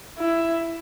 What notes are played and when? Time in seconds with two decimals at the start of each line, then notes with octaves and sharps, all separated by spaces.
0.19 E4